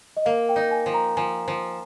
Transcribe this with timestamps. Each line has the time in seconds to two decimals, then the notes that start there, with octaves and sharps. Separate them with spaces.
0.17 D#5
0.26 A#3 F5
0.49 G5
0.56 D#4
0.71 G#5
0.86 F3
0.94 A#5
1.17 F3 G#5
1.48 F3